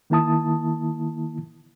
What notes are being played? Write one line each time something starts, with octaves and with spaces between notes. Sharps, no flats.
D#3 A#3 E4 A5 D#6